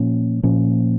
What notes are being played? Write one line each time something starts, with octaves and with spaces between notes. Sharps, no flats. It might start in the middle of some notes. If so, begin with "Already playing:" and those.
Already playing: A#2 F3 A#3 C#4
A#2 F3 A#3 C#4